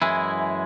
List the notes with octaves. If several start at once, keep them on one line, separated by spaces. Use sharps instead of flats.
F#2 E3 G#3 E4 G#4